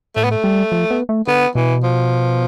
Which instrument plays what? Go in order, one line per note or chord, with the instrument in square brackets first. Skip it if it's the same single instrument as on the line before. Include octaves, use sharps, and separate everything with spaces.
[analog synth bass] A2 [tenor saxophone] A3
[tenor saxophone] B3
A3
[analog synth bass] G3
F3
B3
A3
[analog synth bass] D3 [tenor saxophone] B3
[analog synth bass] B2 [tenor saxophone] E3
[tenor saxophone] F3